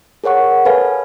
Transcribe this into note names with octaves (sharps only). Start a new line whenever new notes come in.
G#4 A#4 C#5 F#5 C#6
A4 B4 C#5 F5 G#5